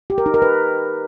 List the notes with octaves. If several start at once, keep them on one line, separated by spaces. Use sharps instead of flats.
G4
A#4
D#4
A#4
B4